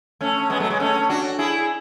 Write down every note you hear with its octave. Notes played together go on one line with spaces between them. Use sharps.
A3 C#4
G#3 B3
F#3 A3
G#3 B3
A3 C#4
D4 F#4
E4 G#4